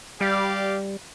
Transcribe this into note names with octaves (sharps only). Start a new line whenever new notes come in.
G3 G4 D5 F5